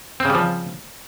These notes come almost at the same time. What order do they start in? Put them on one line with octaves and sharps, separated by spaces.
C4 C#3 G3 F3